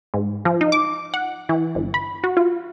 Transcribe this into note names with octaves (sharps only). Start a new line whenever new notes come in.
G#2
F3
D#4
D6
F#5
E3
G1
B5
F#4
F4